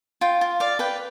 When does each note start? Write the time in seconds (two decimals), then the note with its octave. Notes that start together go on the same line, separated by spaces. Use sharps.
0.21 F4 G5
0.41 F4
0.60 D5 F5
0.79 B4 G5